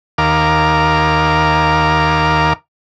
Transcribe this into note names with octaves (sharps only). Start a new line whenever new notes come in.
D#2 A#4 F5 D6